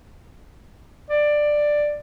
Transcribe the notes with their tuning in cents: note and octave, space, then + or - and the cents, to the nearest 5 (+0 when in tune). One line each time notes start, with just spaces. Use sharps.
D5 +10